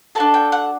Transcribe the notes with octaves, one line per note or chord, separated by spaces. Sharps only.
D4 F#4 A4 A5
G5
F#5